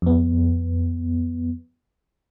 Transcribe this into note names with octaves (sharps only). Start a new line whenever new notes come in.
F2 B3